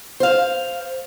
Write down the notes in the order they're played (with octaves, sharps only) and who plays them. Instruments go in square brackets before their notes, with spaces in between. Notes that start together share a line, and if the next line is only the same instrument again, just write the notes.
[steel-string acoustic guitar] C5 F5